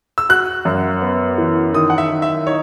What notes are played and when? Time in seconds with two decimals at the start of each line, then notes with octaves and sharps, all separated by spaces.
0.18 E6
0.29 F#4 F#6
0.65 F#2
1.02 B3
1.38 E3
1.74 D#3 D#6
1.90 F#5
1.98 E5
2.10 D#3
2.22 E5
2.47 D#4 C#5